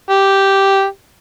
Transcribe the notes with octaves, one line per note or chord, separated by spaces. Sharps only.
G4